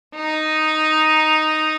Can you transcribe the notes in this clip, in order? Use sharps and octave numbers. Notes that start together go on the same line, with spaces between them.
D#4